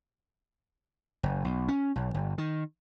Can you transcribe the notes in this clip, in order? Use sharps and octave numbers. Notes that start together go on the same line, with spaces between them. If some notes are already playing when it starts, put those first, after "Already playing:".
F#1
B1
C#4
B1
G1
D#3